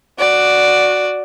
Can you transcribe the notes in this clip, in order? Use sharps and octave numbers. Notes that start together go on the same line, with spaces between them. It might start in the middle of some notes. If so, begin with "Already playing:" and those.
F#4 D5